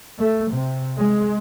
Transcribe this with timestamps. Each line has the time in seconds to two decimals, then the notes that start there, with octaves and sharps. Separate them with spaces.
0.19 A3
0.52 C3
0.98 G#3